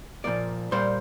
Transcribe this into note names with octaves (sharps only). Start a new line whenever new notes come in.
A#2 F3 A#3 D5
A#2 G3 A#3 C5